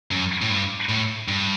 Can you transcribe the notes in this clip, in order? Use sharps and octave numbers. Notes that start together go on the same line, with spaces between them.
F#2
A2
G2
A2
G2